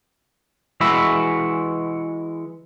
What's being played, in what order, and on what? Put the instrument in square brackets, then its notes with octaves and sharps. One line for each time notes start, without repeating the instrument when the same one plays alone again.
[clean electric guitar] E3 G#3 F#4 E5 B5